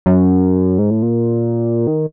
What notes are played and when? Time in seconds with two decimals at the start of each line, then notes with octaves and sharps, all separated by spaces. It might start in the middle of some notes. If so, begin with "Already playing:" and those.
0.06 F#2
0.79 G#2
0.90 A2
1.02 A#2
1.87 D#3